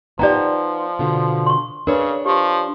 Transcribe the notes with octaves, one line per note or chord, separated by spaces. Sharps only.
F3 B3 D#4 G4 D5 G5 A#5
B2 D3 F4
C6 C#6
C#3 D4 A#4 B4 C#5 D5
F3 G4